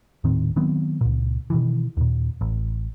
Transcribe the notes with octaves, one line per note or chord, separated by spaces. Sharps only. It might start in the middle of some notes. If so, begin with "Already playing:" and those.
D#1 A2 D#3 C4
D#3 F#3 B3 C4
C#2 A#2
B2 D#3 E3
D#2 A#2
A1